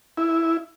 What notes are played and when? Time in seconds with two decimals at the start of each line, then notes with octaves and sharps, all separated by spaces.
0.17 E4